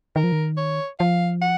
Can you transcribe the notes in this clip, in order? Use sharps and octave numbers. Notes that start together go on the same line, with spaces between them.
D#3 A#4
F3
D#3
C#5
F3 F5
F#5